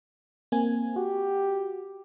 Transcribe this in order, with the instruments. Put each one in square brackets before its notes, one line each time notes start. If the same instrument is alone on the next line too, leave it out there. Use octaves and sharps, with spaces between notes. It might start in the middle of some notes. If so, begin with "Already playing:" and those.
[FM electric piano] A#3 C4 G#5
[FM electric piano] F#4 [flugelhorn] G4